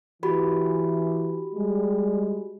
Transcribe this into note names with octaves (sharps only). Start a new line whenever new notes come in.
E3 F#4 G4 B5
G3 G#3